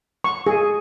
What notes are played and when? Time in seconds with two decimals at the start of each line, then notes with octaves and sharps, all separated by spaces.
0.24 C#6
0.47 G#4